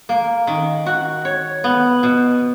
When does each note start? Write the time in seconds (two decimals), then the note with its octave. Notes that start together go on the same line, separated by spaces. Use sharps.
0.09 A#3
0.47 D#3
0.86 F#4
1.25 C#5
1.64 B3
2.03 B2